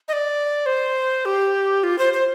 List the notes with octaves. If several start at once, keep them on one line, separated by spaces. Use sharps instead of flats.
D#5
D5
C5
G4
F4
C5
C5